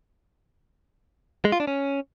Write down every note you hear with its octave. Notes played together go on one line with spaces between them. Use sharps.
G#3
F4
D4
C#4